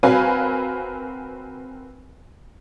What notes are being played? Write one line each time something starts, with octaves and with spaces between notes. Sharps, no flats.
C4 F#4 A#4 B4 F5 G#5